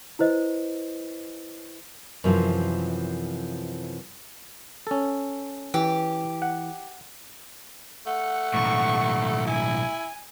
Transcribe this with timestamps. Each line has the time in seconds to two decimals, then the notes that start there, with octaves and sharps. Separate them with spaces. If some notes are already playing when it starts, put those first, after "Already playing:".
0.19 E4 B4 C5 D#5
2.24 F#2 C3 E3 F3
4.87 C#4 A4
5.74 E3 G4
6.42 F#5
8.06 A3 F#5
8.54 B1 A2 C#6
9.47 E4 G#5